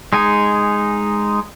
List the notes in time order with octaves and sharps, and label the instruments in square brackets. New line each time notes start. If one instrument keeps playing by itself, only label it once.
[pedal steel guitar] G#3 D#4 G#5